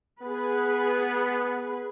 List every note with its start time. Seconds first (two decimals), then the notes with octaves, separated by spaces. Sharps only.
0.22 B3 G#4 B4